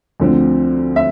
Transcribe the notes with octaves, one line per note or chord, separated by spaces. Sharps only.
D2 D3 F3 C4
E5